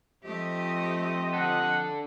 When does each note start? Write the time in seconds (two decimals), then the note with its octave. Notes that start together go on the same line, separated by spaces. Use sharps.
0.24 F3 A3 C4 G4 D#5
1.34 D4 A4 F#5